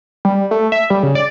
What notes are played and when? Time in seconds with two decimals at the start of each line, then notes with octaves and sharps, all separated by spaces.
0.25 G3
0.51 A3
0.72 E5
0.90 G3
1.03 C#3
1.15 D5